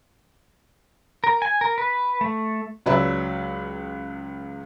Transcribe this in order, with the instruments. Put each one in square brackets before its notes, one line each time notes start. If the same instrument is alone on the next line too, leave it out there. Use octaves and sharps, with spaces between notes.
[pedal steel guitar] A#4
G#5
A#4
B4
A3
[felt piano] C#2 F#3 B4 D5 E5 B5